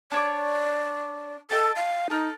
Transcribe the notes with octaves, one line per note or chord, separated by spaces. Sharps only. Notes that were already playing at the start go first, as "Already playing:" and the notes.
D4 C#5 D5 D6
A4 D#5 G5 A5
F5
D#4 A4 A#4